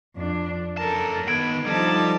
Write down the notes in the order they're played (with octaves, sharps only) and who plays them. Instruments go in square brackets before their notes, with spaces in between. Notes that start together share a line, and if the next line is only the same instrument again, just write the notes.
[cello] F2 D4
[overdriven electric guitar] F#2 A5 [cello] A4 A#4
[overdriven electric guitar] D#3 B5 [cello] B3 [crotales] G#6 D7
[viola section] D3 F3 A5 [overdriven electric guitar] G3 [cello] D#4